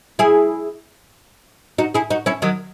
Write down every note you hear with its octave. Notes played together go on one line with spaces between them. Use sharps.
E4 G#4
D#4 F#4
E4 G#4
D#4 F#4
C#4 E4
D#3 F#3